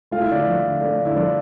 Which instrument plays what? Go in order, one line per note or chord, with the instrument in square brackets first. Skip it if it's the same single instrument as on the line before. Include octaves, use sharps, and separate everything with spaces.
[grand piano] A3 F4
E4
D3 D4
E4
F3
D3
A3 D4
D3
E4
F3 D4